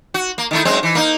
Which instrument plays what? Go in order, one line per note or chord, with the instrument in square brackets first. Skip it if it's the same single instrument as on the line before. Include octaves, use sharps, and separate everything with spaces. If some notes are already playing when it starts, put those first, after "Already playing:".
[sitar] F#4
A#3
D#3 A3 E4
F#2 G#3 C4
E3
A#3 D#4